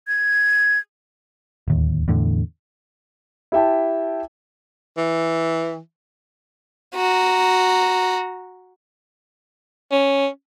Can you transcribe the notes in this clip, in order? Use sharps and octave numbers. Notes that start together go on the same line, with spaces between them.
G#6
D1 D#2
E2 A2 D3
E4 G4 E5 G5 A5
E3
F#4 A#5
C#4